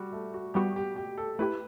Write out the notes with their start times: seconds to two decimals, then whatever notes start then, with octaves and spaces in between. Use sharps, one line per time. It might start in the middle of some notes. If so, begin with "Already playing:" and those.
Already playing: G3 F#4
0.12 A3
0.34 F#4
0.54 G3 B3 F#4 G4
0.76 G4
0.96 G4
1.18 A4
1.39 A3 E4 G4 B4